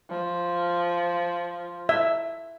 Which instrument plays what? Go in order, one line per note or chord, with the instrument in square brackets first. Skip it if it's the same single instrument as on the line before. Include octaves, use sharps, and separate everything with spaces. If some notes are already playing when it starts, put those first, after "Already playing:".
[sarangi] F3
[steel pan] E5